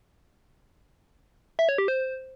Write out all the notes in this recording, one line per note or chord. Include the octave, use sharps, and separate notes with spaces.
E5
C#5
G4
C5